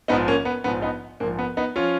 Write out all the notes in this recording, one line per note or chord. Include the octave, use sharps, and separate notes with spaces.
A#1 G#2 F3 B3 D#4
A#3 C#4
B3
A#1 G#2 F3 B3
B3 D#4
A#1 G#2 F3 A#3
B3
B3 D#4
F3 C#4 F4